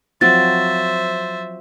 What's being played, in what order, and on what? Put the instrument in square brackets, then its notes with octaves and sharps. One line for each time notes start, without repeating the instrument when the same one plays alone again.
[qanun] F3 F#3 C4 [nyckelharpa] C5 E5 [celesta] A6